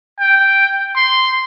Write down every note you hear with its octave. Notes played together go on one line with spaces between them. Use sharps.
G5
C6